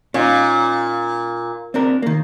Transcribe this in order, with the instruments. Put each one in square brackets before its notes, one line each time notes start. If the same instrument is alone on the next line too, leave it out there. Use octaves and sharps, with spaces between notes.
[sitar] A#2 [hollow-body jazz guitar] C#4 D#4
[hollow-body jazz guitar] C4 D4 A#4
D#3 A#3